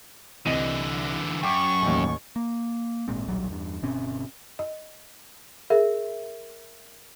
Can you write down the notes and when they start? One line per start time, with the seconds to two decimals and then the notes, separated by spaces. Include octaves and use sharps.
0.46 C2 D3 E3 D#5 D#7
1.43 F#2 G5 C#6 D6
1.82 A1 D#2
2.36 A#3
3.08 G#1 A#2 G#3 C4
3.26 D#1 B1 F#3 G3
3.50 E2 G2
3.82 G1 B2 C4 C#4
4.59 D#5
5.70 G#4 A#4 E5